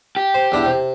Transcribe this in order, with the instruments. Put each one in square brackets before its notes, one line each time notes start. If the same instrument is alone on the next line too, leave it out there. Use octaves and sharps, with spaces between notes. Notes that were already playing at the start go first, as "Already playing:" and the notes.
[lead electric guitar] G4
[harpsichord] C5
E2 D4 E4
C3